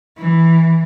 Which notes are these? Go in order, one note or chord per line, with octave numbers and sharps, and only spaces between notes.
E3